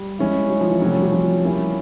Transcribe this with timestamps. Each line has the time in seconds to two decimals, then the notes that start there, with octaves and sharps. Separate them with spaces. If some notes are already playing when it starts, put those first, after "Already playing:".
Already playing: G3
0.19 G#3 C#4 E4
0.50 F#3
0.61 F3
0.70 E3
0.81 C3 F3 F#3 A3 C#4 F#4
0.92 G3
1.02 F#3
1.12 F3
1.43 G3 A#3 C#4 E4 G4